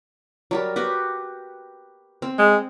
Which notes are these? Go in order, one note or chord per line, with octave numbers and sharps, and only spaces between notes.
F#3 G3 A#4
F#4 G4 B4
C4
G#3